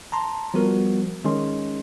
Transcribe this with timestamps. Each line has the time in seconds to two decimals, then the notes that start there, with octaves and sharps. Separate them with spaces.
0.12 A5 A#5 C6
0.54 F3 G3 B3 F#4 A#4
1.24 D#3 G#3 C#4 C6